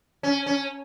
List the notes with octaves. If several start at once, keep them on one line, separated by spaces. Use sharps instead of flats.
C#4
C#4